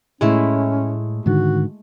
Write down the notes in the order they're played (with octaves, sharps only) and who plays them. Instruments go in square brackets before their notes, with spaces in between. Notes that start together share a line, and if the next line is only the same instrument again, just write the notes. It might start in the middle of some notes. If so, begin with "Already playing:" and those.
[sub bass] A2 [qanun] G#3 A3 E4 [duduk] C#4
[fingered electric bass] G#2 D3 D#3 [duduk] F#4